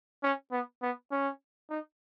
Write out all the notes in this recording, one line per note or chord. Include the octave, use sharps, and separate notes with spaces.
C#4
B3
B3
C#4
D#4